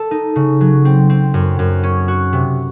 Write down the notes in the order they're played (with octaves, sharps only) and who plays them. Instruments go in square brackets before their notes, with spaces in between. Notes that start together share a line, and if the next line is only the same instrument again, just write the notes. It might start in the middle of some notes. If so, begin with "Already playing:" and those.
Already playing: [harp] A4
D#4
C#3
F#3
C4
C4
F#2
F#2
C#4
F#4
C3